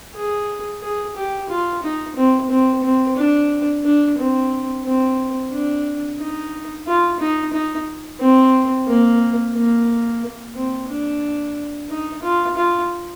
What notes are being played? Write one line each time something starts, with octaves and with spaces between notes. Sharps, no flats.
G#4
G#4
G4
F4
D#4
C4
C4
C4
D4
D4
C4
C4
D4
D#4
F4
D#4
D#4
C4
A#3
A#3
C4
D4
D#4
F4
F4